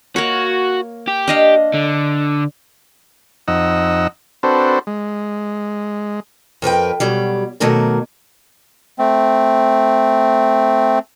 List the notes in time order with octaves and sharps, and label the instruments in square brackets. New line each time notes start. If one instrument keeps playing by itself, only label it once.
[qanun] A#3 A#4 C#5 [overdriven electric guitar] F#4
[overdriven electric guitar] G4
[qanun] D4 D#5 F5
[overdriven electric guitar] D3
[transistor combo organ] F2 D#4 D#5 F#5 E6
C4 D4 F#4 A4 B4 C5
G#3
[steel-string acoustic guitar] F2 A#4 B4 G5
B2 F#3 G3
B2 D#3 F#3 A3 A#3 A#4
[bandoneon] A3 C4